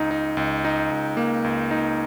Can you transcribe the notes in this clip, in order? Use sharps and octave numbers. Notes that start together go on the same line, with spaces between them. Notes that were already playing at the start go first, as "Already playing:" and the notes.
Already playing: C#2 D#4
D#4
C#2
D#4
C#2
A#3
C#2
D#4